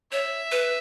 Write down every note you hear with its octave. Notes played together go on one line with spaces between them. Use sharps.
C#5 E5
B4